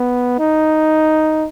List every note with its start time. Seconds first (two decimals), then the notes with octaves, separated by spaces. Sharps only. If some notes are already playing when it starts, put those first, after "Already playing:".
Already playing: B3
0.39 D#4